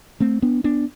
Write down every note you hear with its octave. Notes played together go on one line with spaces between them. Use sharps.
A3 C4
B3 D4
B3 D4